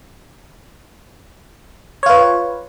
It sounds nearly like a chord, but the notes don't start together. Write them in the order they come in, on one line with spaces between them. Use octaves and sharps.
C#5 F4 B4